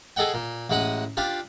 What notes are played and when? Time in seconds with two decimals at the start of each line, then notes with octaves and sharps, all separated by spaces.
0.16 G#4 A4 D#5 F#5 G5
0.34 A#2
0.70 A1 G#3 F#5 D#6
1.17 D4 F4 G4